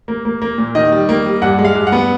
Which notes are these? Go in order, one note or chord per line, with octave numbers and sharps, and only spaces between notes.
A#3
A#3
A#3
A#2
D#3 D#5
G3
A#3
G3
G2 F#5
G#3
F5
G2
F#5
B3